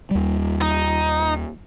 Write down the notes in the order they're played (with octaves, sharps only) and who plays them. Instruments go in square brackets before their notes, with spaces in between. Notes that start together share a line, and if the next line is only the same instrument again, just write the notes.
[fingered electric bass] D#2 G3
[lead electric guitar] D#4